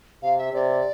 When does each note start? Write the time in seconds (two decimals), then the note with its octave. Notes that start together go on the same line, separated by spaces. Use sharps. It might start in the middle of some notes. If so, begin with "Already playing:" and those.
0.23 C3 F5
0.38 E5
0.53 C3 D5